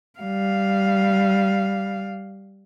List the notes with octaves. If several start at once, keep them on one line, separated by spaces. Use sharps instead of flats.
G3 F5